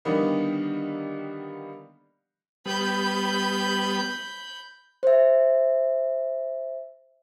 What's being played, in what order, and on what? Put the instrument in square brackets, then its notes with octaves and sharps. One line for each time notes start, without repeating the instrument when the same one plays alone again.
[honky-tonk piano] D3 D#3 G3 A#3 B3 D#4
[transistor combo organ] G3 B3 [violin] B5 G6
[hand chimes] C5 E5